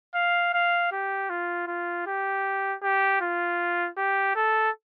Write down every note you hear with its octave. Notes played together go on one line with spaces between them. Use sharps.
F5
F5
G4
F4
F4
G4
G4
F4
G4
A4